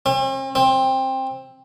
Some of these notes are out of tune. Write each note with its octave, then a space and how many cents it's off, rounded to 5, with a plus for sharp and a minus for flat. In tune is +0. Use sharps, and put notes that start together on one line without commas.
C4 +45
C4 +15